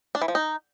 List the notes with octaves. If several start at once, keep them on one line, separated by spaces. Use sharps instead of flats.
D4
E3
F3
D#4